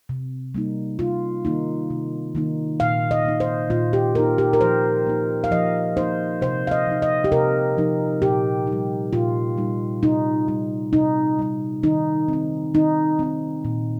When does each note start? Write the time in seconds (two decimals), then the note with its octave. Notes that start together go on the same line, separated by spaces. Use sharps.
0.09 C3
0.55 G3 A#3 D#4
0.99 C3 F4
1.45 D#3 A#3 D#4
1.90 C3
2.35 D#3 A#3 D#4
2.80 A#2 F5
3.11 D#5
3.25 A#3 D#4
3.40 C5
3.70 A#2 F4
3.93 G4
4.15 A#3 D#4 A#4
4.38 G4
4.53 A#4
4.61 F3 C5
5.06 A#3 D#4
5.44 F5
5.51 F3 D#5
5.97 A#3 D#4 C5
6.41 C3 C5
6.67 F5
6.71 D#5
6.87 F3 D#4
7.02 D#5
7.24 G4
7.32 C3 A#4
7.78 F3 D#4
8.22 A#2 G4
8.67 D#4
8.72 G3
9.13 A#2 F4
9.57 G3 D#4
10.03 C3 D#4
10.48 G3 D#4
10.93 C3 D#4
11.39 G3 D#4
11.83 D#3 D#4
12.28 C4 D#4
12.74 D#3 D#4
13.19 C4 D#4
13.65 A#2